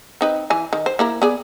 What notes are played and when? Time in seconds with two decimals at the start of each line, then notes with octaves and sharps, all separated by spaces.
0.21 C4 D#4 B4
0.50 E3 G#5
0.73 D#3
0.86 C5
0.99 A#3 E4 A#4
1.22 B3 G#4 D5